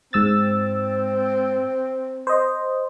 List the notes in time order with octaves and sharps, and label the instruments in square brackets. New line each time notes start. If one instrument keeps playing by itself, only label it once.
[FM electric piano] G#2 E6 A6 [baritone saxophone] C4
[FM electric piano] C5 D#5